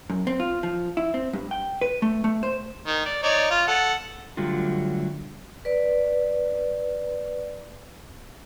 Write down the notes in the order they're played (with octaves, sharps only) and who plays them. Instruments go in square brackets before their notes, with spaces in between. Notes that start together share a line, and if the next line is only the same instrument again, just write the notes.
[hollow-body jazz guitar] F#2
C4
F4
F3
E4
C4
G2
G5
B4
A3
A3
C5
[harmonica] D#3
D5
D#4 C#5 D5
F4
A4 F#5
[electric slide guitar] D3 F#3 G3 A3 F4
[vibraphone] B4 D5